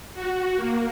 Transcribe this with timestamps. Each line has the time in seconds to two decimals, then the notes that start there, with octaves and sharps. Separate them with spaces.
0.14 F#4
0.57 A#3